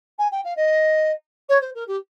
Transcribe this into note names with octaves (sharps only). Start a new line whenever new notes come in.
G#5
G5
F5
D#5
C#5
C5
A#4
G4